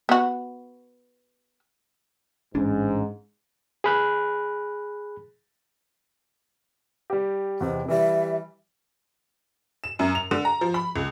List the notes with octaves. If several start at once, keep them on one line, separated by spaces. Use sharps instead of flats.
B3 F#4
A1 G#2 C#4 D4
G#4 B5 F#6
G3 G4
E2 C3 C4 D#5
E3 G3 E5
E7
F#2
F7
D3
A#5
F3
B5
C#2